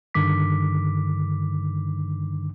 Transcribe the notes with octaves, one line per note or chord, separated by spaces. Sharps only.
G2 D3 D#3 D6 B6